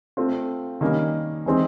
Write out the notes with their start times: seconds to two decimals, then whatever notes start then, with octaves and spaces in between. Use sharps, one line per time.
0.17 A3 C4 F4
0.81 D#3 G3 A#3 C#4
1.46 E3 G#3 C4 D#4